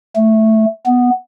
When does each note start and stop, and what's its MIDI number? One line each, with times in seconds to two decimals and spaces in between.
0.16 0.65 57
0.86 1.10 59